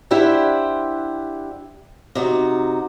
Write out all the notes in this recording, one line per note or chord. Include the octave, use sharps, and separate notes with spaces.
D4 E4 G4 C5 E5 F#5
C3 D#4 F#4